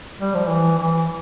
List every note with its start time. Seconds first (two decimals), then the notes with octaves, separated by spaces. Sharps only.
0.20 G3
0.34 F3
0.48 E3
0.78 E3